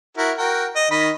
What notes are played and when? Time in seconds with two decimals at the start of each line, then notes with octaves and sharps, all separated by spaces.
0.17 E4 F#4 A#4
0.38 F#4 A#4 G5
0.76 D#5
0.91 D#3 D#5 B5